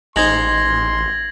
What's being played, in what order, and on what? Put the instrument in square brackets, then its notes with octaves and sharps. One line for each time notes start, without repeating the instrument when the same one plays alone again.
[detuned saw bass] A1 [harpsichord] G#3 D#4 C5 [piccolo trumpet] C6 [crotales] G#6 A#6 F#7